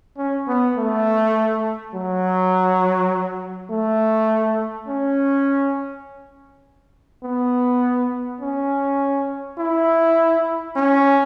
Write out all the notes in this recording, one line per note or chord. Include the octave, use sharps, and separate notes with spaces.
C#4
B3
A3
F#3
A3
C#4
B3
C#4
E4
C#4